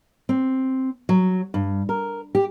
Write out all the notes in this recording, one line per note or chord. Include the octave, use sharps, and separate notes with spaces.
C4
F#3
G2
A#4
G4